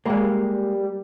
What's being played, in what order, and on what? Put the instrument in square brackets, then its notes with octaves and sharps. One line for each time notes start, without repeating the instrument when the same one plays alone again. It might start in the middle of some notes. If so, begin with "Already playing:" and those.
[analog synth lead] G3 [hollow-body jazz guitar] G#3 A#3